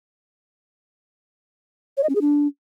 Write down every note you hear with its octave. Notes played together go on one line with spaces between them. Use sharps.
C#5
D#5
C#4
G#4
D4